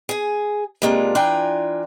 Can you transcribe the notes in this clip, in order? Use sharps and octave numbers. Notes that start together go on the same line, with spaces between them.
G#4 G#5
C3 G#3 A#3 D4 F4
E3 D4 F4 G5 G#5 A#5